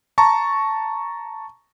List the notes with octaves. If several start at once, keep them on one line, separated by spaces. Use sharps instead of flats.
A5 A#5 C#6